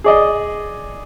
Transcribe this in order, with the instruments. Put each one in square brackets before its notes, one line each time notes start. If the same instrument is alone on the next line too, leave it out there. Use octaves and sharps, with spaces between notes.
[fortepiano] G#4 D5 D#5